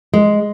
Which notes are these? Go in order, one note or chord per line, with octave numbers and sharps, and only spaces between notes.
G#3